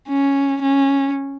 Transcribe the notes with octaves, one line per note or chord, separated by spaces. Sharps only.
C#4
C#4